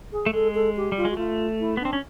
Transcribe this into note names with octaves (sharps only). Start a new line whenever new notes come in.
G#4
A3
G#3 A4
A4
G4
G3 F4
G#3
F#4
A3 F4
E4
B3
D4
C4
C#4